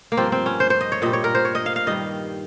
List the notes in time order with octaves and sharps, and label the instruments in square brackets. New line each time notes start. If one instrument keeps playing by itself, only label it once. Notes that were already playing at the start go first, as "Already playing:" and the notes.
[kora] A#3
G2 F3 C4
C4
C#4
C5
C5
D#5
C#5
A#2 G3 D#5
C#5
A#4
C5
C#5
D#5
F5
F5
G2 D#3 G3 D#5